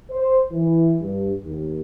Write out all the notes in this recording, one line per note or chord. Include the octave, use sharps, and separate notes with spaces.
C5
E3
G2
D#2